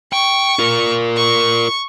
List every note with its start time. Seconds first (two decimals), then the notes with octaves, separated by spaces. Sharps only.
0.13 G5 C#6
0.59 F4 A#4
1.17 C#6